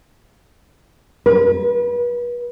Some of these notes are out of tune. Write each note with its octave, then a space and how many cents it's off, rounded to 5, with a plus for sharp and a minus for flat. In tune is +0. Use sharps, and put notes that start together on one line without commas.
B4 -35